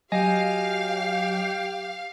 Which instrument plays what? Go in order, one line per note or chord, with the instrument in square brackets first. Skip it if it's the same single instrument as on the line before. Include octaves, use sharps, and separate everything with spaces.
[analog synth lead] F#3 [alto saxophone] G4 [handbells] D#5 G#5 [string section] F5